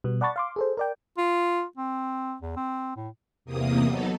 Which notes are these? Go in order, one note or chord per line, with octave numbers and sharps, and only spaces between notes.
B2 G3 B3
D5 F#5 A5 B5 C#6 A6
F5 C6 D6
G#4 A4 C5
A#4 D5 G5
F4
C4
E2
C4
A2
E2 C3 A#3 D#6
F#3 B3 D#4 A4